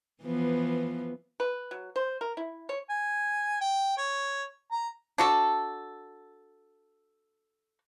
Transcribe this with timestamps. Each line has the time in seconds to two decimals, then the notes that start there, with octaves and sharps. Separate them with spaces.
0.23 E3 F3 B3
1.40 B4
1.71 F#3
1.96 C5
2.21 A#4
2.37 E4
2.69 C#5
2.90 G#5
3.61 G5
3.98 C#5
4.72 A#5
5.18 D4 F#4 A4